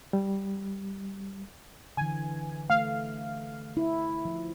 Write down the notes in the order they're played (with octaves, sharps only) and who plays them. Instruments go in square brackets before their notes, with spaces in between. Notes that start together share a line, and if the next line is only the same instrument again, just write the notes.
[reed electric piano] G3
[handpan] D3 E3 [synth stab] G#5
[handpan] A3 [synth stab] F5
[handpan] E4
F3